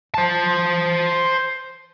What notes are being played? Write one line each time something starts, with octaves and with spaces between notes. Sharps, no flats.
C5 A5